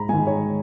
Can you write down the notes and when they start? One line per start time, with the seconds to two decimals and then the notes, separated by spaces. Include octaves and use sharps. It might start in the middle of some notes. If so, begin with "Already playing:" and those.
Already playing: G#2 A#5 B5
0.09 D#3 G#3 G#5
0.27 C#5